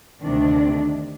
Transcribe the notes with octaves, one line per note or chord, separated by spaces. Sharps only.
D2 C3 D#3 D4